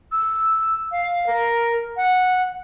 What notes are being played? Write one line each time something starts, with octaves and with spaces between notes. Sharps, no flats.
E6
F5
A#4
F#5